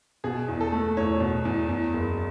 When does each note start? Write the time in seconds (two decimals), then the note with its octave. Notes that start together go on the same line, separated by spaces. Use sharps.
0.24 B2 G#4
0.48 E2
0.61 A4
0.72 A3
0.97 E2 C#5
1.20 B2
1.45 E2
1.69 E2
1.93 F#1